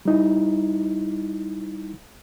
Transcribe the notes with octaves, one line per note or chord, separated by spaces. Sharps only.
G3 D#4 E4